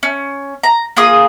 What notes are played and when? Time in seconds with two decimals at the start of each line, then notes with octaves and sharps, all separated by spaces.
0.03 C#4
0.63 A#5
0.97 A#3 F4 G#4 D#6